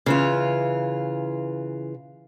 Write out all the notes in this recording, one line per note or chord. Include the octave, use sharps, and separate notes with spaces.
C#3 E3 F4